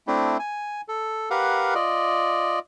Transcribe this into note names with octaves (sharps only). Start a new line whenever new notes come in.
A3 C4 D4 E4
G#5
A4
G4 A#4 B4 F5 F#5
F4 D5 D#5